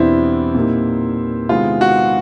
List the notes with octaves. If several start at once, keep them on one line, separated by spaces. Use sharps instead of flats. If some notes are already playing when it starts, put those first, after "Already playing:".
Already playing: E2 B2 G3 B3 C4 D4 E4
A#2 G3 A#3 D#4
C3 D#3 G#3 B3 E4 F4
F#4